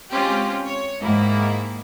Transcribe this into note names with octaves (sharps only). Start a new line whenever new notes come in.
G#3 C4 C#4 F4 G4
C#5
G#2 D#3 A#3 E4